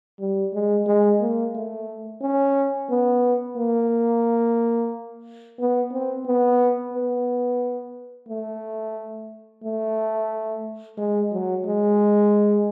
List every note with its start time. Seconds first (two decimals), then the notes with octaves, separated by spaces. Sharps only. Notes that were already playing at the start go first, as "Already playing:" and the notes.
0.20 G3
0.53 G#3
0.87 G#3
1.20 A#3
1.55 A3
2.21 C#4
2.89 B3
3.56 A#3
5.59 B3
5.92 C4
6.26 B3
6.93 B3
8.28 A3
9.63 A3
10.97 G#3
11.31 F#3
11.65 G#3